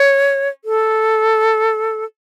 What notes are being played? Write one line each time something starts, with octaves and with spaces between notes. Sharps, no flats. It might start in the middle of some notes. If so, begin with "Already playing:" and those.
Already playing: C#5
A4